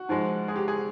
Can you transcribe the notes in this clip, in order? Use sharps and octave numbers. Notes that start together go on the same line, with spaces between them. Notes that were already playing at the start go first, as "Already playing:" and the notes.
Already playing: F#4
G#2 F3 G#3
G#4
G4
G#4